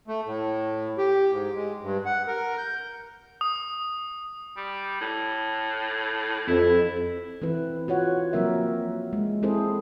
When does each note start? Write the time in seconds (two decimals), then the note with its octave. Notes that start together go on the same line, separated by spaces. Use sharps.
0.08 A3
0.26 A2
0.98 G4
1.31 G#2
1.55 G#3
1.82 G2
2.06 F#5
2.27 A#4
2.58 G6
3.41 D#6
4.57 G3
5.01 A2
6.47 F2 E4
7.42 E3 C4 E4 B4
7.88 F4 F#4 C#5 F#5
8.33 F3 F#3 A#3 C4 A#4 E5
9.13 G#3
9.43 C4 E4 G#4 A4 C5